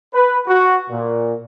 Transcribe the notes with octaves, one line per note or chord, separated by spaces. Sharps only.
B4
F#4
A#2